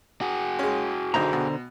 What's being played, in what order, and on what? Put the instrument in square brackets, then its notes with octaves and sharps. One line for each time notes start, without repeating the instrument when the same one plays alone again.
[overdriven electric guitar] F#4 G#4
[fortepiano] G#3 C#4
[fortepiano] B1 D#4 [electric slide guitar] D3 C5 A#5
[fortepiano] B2